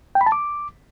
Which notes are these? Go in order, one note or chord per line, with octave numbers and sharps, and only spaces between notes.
G5
B5
A5
D6